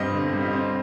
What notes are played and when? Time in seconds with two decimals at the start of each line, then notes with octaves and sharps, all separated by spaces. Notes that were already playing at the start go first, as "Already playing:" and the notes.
Already playing: G2 G3 C4 D#5
0.13 D3
0.33 G3
0.42 D#5
0.53 C4